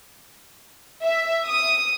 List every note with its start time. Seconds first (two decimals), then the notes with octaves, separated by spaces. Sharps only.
1.03 E5
1.46 D#6